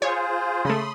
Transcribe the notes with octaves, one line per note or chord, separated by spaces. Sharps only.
F4 G#4 C5 C#5
C#3 A3 B5 C6 D#6